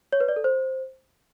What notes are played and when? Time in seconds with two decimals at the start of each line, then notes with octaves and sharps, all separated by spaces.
0.12 C#5
0.20 B4
0.28 D5
0.36 A4
0.44 C5